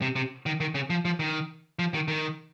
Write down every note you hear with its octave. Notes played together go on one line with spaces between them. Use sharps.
C3
C3
D#3
D#3
C#3
F3
F3
D#3
F3
D#3
D#3